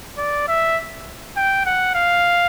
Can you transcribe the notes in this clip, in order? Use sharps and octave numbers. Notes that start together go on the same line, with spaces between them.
D5
E5
G5
F#5
F5